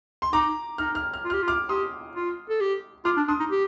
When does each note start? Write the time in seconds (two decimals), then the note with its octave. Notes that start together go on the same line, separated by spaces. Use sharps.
0.22 C6
0.33 D#4 A#5 D6
0.78 D#4 F6
0.95 F6
1.14 F6
1.25 F4
1.30 G4 F6
1.43 F4
1.48 D6 F6
1.69 G4 C6 D#6
2.15 F4
2.49 A4
2.61 G4
3.05 F4 D6 F6
3.17 D4
3.28 D4 C6 D#6
3.40 D#4
3.51 G4